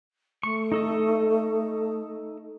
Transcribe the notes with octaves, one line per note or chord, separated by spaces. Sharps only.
A3 C#6
D#4 A4 D#5